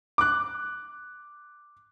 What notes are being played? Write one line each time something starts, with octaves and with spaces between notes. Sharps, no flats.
D6 F#6